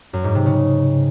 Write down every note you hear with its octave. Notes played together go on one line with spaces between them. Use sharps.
F#2
G#2
C3
C#3